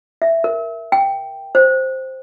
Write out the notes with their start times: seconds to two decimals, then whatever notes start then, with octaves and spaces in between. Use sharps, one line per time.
0.22 E5
0.44 A#4
0.92 G5
1.55 C5